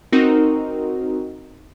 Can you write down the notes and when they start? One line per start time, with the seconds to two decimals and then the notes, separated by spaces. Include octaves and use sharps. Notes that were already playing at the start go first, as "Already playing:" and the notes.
0.12 C4 D#4 F#4 A#4